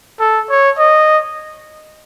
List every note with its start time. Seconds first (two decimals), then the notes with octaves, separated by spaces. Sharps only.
0.20 A4
0.50 C#5
0.78 D#5